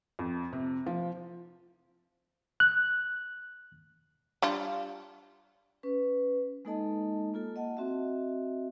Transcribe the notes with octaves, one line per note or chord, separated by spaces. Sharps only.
F2
C3
F3
F#6
G3 D4 F4
C#4 B4
G#3 A#3 D#4 A4 D#5 A5
A#3 F4 A4
D#5 F#5 A5
C4 F#4 D#5 E5